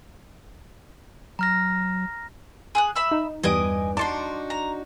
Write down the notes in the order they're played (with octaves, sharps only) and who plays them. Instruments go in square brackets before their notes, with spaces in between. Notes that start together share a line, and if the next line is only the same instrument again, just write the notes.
[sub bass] F#3 [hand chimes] A#5 F6 A#6
[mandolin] G#4 D#6 F#6
E5 B5 E6
[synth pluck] D#4
[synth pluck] E2 G3 D7 [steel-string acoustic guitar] G2 [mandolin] D#5 G#5 D#6
[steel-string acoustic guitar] D4 D#4 F#4 [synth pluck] A5 C6 [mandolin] D6
[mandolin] A#5